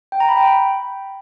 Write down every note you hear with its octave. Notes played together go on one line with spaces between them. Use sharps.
G5
A#5
B5
G5
B5